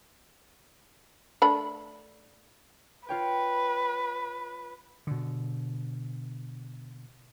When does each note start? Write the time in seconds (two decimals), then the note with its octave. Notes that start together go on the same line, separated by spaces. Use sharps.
1.42 A3 D4 B5
3.09 F4 B4 C#5 G5
5.07 B2 D3